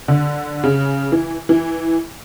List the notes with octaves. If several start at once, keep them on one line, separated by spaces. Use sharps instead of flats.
D3
C#3
E3
E3